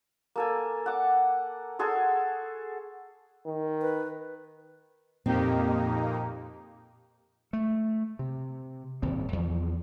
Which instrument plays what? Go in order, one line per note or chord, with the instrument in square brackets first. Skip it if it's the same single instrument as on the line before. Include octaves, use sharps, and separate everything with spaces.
[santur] A#3 A4 G#5
F#5 D6
F#4 G#4 A4 C6
[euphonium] D#3
[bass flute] B4
[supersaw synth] F2 A#3 D#4 [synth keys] A#2 G4 [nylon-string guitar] C4
[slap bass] A3
C3
D#1 G#1 C4
E2 F3